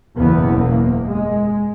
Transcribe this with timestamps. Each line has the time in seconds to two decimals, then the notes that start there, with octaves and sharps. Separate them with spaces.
0.16 F#1 E2 B2 B3
0.61 A#3
1.07 G#3